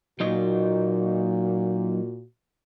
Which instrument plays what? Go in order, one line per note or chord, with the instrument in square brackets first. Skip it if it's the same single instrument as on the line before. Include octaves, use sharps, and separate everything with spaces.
[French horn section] A#2 F#4 [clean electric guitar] F#3 D#4 D#5